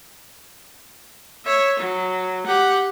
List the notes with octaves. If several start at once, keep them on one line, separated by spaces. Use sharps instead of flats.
C#5 E5
F#3
G4 F#5